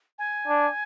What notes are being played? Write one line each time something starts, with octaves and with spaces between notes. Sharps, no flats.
G#5
D4